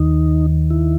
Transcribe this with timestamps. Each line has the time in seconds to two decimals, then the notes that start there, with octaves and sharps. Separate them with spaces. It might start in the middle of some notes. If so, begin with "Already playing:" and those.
Already playing: D#2 D#3 D#4
0.70 E4